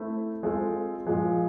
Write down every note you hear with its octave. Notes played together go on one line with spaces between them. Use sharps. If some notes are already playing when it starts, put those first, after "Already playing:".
Already playing: A3 C4 E4
G#3 C4 F4 A4
A#2 F3 G#3